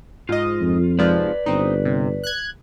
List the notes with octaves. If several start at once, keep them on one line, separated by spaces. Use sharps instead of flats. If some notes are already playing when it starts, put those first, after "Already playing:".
G#2 F4 D#5
F2
G#2 C3 F3 B4 D5
G1 C4 D#4
C3
F#6 G#6